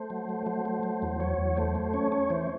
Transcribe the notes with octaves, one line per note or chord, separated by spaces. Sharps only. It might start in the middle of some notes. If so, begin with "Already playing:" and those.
Already playing: A3 C5
F#3
A3
F#3 C5
A3
F#3
E2
F#3 C#5
E2
A3 C5
A3
C#4 C#5
C#4 C#5
E3 C5